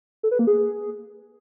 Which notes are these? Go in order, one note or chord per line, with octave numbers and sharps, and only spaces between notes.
A4
B4
A#3
G#4